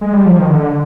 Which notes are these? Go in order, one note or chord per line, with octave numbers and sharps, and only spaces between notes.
G#3
G3
F3
D#3
D3